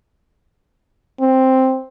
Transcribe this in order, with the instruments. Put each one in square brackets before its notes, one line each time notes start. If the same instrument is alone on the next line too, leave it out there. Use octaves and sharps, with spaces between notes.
[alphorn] C4